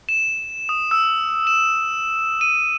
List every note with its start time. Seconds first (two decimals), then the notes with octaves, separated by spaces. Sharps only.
0.09 E7
0.69 D#6
0.91 E6
1.47 E7
2.41 D#7